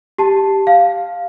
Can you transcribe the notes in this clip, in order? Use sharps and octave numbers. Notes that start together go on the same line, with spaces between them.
G4 A5
F5